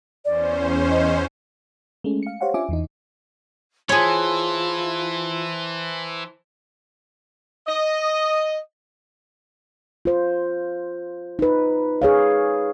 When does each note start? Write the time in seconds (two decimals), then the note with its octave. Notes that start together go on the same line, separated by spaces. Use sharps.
0.25 E2 C#4 C5 D5
0.90 D#5
2.04 G#3 A3 C#4
2.23 F5 C#7
2.41 G4 C5 C#5 F5 F#5
2.54 C#4 D4 F4 E5 G#5 D6
2.69 E2 E3 D#4
3.89 E3 E4 F4 G#4 C5 C#5 A5 C6
7.68 D#5
10.05 F4 C5
11.39 D#4 B4
12.02 G#4 C#5 F5